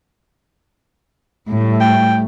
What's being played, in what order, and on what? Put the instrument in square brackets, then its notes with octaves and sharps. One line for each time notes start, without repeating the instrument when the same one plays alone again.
[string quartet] A2 [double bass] G3 A3
[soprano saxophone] G5